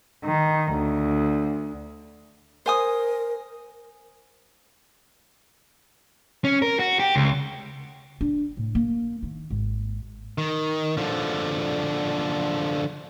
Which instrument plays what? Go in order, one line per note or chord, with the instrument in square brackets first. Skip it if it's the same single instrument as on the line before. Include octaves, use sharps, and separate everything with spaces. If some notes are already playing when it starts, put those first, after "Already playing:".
[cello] D#3
D2
[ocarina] A#4 [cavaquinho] C5 G#5 D#6
[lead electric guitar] C#4
A#4
F#4
G4
C#2
[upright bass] D4
A2
A#3
D#3
G#1
[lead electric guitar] D#3
D3 F3